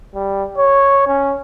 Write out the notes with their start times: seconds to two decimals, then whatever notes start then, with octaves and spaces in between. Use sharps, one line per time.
0.15 G3
0.57 C#5
1.07 C#4